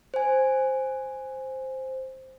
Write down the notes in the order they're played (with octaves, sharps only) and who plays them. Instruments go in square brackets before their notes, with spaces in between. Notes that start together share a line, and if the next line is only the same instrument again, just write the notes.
[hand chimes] C5 G#5